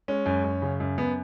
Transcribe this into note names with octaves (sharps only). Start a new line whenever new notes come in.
G#3 C#4
F#2
F#2
C#3
F#2
F#2 B3